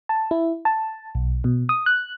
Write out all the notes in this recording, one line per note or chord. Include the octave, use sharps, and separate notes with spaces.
A5
E4
A5
B1
B2
D#6
F#6